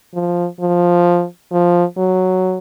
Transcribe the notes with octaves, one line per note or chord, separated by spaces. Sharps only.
F3
F3
F3
F#3